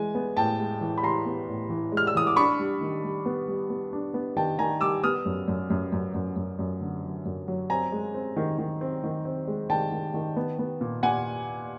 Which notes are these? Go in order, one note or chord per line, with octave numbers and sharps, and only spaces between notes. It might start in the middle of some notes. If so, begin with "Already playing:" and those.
Already playing: E3 G#3 G#5
B3
A2 G5 A5
G#3
E3
B5
E3 A#5 C6
B3
A2
E3
G#3
F6
E6
E3 D#6
D6
D4 B5 C#6
G3
D#3
G3
B3
G3
B3
D4
B3
D#3 G5 A5
D#3 G#5 A#5
G3 D6 E6
B3 D#6 F6
F#2
F#2
F#2
F#2
F#2
F#2
F#2
D3
F#3
F#2
F#3
C4 G#5 A#5
G#3
C4
D#3
D#3
C4
D#3
C4
G#3
D#3 G5 A5
D#3
D#3
B3
B3
A#2
A#2 F#5 G#5